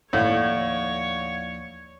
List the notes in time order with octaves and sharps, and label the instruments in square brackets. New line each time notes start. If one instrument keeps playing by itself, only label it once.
[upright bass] D#2 F3 [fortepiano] A2 [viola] C#5 [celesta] D5 F5 F#5